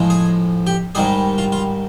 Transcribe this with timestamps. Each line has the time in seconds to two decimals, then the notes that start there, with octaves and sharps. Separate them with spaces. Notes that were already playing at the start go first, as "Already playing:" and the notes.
Already playing: A2 F3 G#3
0.10 G#4
0.67 G4
0.95 G#2 D#3 G3 G#4
1.38 F4
1.52 F4